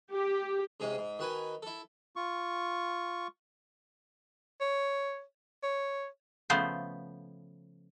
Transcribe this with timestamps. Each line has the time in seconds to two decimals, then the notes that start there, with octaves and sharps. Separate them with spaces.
0.12 G4
0.80 G#2 C3 G#3 C#4
0.98 G#2
1.19 D#3 F#4 B4 G#5
1.62 E4 A4
2.16 F4 C#6
4.61 C#5
5.63 C#5
6.50 C#3 F3 A3 B3 C5